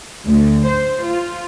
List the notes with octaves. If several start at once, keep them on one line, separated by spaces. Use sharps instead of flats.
D2
C5
F4